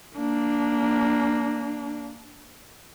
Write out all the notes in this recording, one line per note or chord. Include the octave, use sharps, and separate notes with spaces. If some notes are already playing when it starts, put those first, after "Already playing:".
A#3 D4